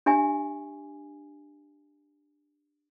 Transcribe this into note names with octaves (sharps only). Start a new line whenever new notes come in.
D4 G4 E5 G#5